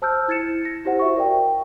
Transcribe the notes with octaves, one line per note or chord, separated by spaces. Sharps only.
C5 A5 E6 F6 G6
E4 G#6 A6 C#7 E7
A#6
E4 G4 C5 F#5
F#4 E5 C#6
A#4 D5 G5